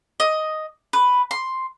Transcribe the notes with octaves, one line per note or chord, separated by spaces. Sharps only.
D#5
B4
C6